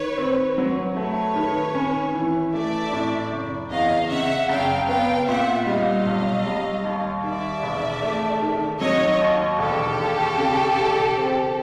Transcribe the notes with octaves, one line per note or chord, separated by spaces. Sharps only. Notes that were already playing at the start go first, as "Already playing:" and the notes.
Already playing: D#3 B4 C#5
C4
F#3
A3 B4 C#5
D#3
C#4
E3
A3 D5 E5
A2
F#1
E2 D#5 F5
C#3 E5 F#5
F#1 F5 G5
B3 F5 G5
A#2 E5 F#5
G3 D#5 F5
B1
G3
D#2
D#3 D5 E5
E1
A3
D#3
F#3 C#5 D#5
D#2
E1 G4 A4
D#2
C#3
E1
C4